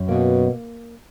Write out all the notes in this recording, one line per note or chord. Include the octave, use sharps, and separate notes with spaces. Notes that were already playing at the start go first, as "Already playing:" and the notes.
Already playing: F#2
B2 A#3